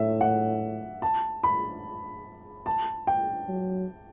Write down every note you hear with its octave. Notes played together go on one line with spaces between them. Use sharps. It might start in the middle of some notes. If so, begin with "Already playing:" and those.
Already playing: A2 E5
F#5
A5
B5
A5
G5
F#3